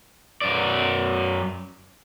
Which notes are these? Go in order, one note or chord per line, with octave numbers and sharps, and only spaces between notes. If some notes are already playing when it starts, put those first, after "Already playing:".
F#2 D5